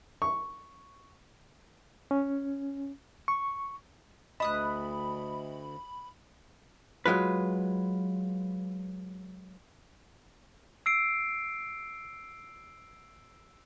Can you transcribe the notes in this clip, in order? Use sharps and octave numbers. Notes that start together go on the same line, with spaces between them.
C#6
C#4
C#6
D2 D#5 A5 B5 D#6 F#6
F#3 G#3 F4 B4
E6 C7 D7